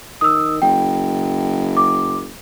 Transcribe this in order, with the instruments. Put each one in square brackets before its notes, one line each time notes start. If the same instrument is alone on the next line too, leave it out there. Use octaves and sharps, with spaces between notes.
[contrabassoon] D#3 [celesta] D#6 E6
[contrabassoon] F#1 [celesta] G5
[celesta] D6